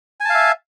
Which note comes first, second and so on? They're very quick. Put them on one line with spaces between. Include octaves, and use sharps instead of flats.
G#5 A5 F5 E5